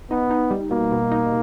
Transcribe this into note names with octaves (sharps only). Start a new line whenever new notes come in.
B3 D#4
D#4
G3
B2 A#3
B2
D#4